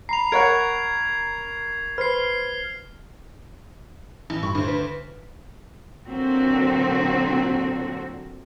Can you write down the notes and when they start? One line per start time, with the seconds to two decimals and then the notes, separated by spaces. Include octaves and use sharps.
0.09 A#5 B5 C7 F7
0.32 A#4 C#5 F#5 G#6
1.98 B4 C5 F6 C7
4.30 A1
4.43 G2 B5 C#6
4.55 D2 C5
4.68 B4
6.08 A#2 D3 F#3 C4 F#4